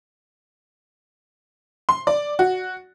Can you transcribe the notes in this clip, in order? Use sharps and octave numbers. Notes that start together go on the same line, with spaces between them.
C6
D5
F#4